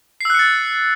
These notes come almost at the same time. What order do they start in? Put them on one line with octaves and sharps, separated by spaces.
C7 E6 F#6 C#7 A6